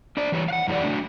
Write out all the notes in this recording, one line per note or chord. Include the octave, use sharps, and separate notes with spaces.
D4 C5 D5
E3 G3 C#5
F5 F#5
F#2 E3 F4 G4 D5
F#3 A3 D4